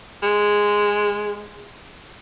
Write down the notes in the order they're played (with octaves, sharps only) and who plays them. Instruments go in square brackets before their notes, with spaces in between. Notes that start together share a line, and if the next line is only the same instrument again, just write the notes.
[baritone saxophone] G#3